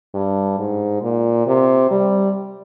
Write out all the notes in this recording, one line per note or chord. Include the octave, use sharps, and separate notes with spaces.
G2
G#2
A#2
C3
G3